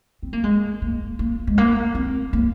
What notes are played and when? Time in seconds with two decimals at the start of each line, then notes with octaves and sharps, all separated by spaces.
0.23 C4
0.33 A#3
0.44 G#3
0.82 A#3
1.19 A#3
1.47 G#3
1.58 A#3
1.95 C4
2.33 A#3